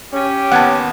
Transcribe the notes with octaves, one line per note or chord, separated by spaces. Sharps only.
C#4 G4
D#2 B3 F#5 A5 G#6